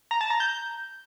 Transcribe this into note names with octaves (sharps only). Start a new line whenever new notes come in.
A#5
A5
A#5
G6